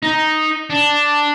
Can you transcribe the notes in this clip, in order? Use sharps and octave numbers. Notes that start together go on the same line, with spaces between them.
D#4
D4